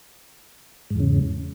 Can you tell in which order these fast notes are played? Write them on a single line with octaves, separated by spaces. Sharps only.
G#2 E2 C#3